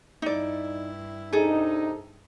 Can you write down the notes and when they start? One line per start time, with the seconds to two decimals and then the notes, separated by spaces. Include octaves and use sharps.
0.22 G2 D#4 E4 D5
1.33 C3 D4 D#4 G#4 A4